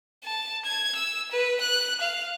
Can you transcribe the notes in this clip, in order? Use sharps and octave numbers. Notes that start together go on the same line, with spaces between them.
A5
G#6
E6
B4
F#6
F5